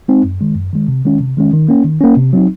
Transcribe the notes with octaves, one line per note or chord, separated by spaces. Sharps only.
G#3 C4 D#4
F#2
D#3 G#3
F#2
D#3 G#3
C3
D#3 G#3 C#4
C3
D#3 G#3 C#4
D#3
A#3 C#4
D#3
A#3 C#4
C3
F#3 C4 D#4